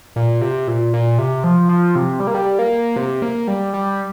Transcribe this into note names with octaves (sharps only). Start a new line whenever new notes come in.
A#2
C3
A#2
A#2
C3
F3
F3
C3
G3
A#3
G3
A#3
C3
A#3
G3
G3